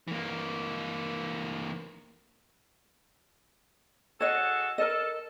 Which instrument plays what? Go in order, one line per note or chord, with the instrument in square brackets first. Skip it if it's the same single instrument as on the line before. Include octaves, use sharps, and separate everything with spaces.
[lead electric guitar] E3 A#3
[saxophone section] F#4 G#4 A4 [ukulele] C#5 D#5
[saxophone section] A4 [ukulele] A#4 D#5